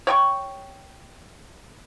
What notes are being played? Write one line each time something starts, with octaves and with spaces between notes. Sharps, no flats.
C#5 G5 C#6